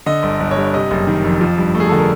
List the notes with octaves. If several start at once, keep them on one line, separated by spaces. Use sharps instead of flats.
D3 D#5
G1
G1
C#5
G2
C3 D#5
F#1
D#3
F2
F3
G2
A3
G#4
D3 A4
A#4